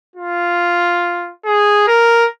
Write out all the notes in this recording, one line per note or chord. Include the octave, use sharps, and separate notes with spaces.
F4
G#4
A#4